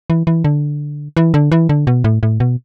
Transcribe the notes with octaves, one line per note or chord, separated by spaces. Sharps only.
E3
E3
D3
E3
D3
E3
D3
B2
A2
A2
B2